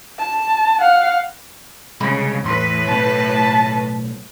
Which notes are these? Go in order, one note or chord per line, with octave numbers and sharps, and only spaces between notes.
A5
F5 F#5
C2 C#3 G#3 B5
E2 A2 B4 C6
B1 A3 A5